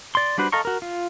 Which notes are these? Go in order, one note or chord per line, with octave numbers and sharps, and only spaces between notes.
D5 C6
G3 D4 F#4 B4 C5
A4 D#5 F5 A#5 C#6
F#4 A#4
F4